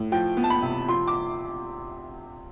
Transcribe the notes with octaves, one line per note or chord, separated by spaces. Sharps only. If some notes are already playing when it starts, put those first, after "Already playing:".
Already playing: A2
F3 G5
B3
A5
B5
C3
F3 C6
D6